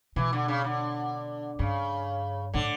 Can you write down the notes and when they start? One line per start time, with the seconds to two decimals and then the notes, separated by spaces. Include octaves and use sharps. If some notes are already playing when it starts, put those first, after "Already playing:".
0.16 B2 E3
0.33 D3
0.48 C#3
0.64 D3
1.59 G2 C#3
2.54 A2 D3